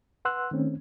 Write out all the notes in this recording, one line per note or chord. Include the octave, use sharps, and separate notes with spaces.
B4 F#5 C6 E6 F#6
D#3 A3 C4 C#4